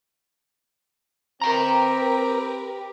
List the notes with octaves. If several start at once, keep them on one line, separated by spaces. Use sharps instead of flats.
C4 G4 A#4 B4 G5 A#5